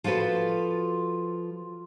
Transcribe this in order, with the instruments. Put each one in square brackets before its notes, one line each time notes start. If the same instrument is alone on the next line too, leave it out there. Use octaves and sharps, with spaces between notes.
[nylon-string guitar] F3 F4 F#4 A4 B4